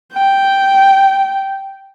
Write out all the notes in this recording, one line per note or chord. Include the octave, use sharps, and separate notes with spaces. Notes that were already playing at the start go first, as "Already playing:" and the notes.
G5